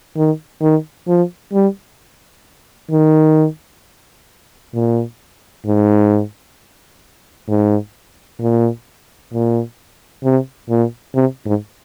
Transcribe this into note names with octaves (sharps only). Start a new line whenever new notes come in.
D#3
D#3
F3
G3
D#3
A#2
G#2
G#2
A#2
A#2
C3
A#2
C3
G#2